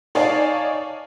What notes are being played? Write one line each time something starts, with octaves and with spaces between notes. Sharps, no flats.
D#4 C#5 D5 F5 G#5 A5